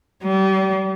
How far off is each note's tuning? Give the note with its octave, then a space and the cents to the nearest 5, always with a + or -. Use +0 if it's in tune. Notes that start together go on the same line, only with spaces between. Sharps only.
G3 -35